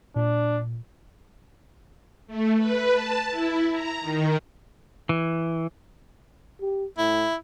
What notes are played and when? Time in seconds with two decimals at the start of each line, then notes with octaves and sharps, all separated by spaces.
0.16 A#2 D4
2.27 A3
2.57 B4
2.92 A5
3.30 E4
3.72 A#5
4.01 D#3
5.09 E3
6.61 G4
6.98 A2 E4